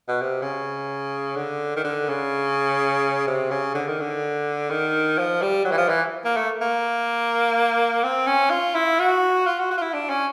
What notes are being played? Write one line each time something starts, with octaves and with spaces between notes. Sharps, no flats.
B2
C3
C#3
D3
D#3
D3
C#3
C3
C#3
D3
D#3
D3
D#3
F3
G3
F#3
E3
F3
E3
A#3
A3
A#3
C4
C#4
F4
E4
F#4
F4
F#4
F#4
F4
E4
D4
C#4